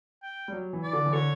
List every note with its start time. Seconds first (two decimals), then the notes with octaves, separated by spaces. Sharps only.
0.23 G5
0.48 G3
0.52 F#3
0.73 E3
0.83 D5
0.93 D3
1.06 E3
1.13 D3 C#5